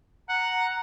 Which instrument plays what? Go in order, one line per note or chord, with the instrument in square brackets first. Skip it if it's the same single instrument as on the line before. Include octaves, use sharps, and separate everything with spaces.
[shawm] F#5 [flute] A#5